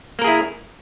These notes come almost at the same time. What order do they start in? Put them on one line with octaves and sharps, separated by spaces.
A#3 A#4 G#4 E4